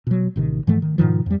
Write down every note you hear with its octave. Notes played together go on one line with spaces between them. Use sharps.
B2 F#3
A1 C3 D#3
G#2 E3 F3 A3
D#3
G#2 B2 D#3 F3
F2 G3